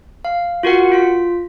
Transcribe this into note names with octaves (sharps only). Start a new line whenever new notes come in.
F5
F4 F#4 A#4 F#5
F4 B6